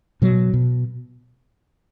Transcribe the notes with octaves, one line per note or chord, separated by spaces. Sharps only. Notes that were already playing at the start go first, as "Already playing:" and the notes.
B2 F#3
B2